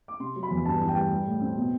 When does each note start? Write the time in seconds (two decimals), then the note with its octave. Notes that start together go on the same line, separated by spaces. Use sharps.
0.08 D6
0.20 C3 C6
0.36 F#3
0.43 B5
0.51 E2
0.65 G2 A5
0.81 E3
0.88 G5
0.96 G3
1.11 G3
1.26 A2
1.41 C4
1.56 B2